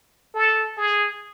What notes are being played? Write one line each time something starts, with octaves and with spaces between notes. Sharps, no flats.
A4
G#4